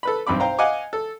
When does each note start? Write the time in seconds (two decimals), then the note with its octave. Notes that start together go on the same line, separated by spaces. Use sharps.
0.03 A4 B4 B5
0.27 B1 G2 C4 B5 D6
0.40 C5 F5 G5 A#5
0.59 D#5 F5 F#5 G#5 D6
0.93 A4